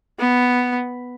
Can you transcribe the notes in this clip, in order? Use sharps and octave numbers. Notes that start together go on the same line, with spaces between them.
B3